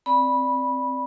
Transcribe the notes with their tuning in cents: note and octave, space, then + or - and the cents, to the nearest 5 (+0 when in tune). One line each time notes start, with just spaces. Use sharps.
C4 +0 D5 +0 B5 -15